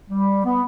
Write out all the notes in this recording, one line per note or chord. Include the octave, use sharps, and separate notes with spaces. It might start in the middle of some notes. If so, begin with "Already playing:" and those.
G3
B3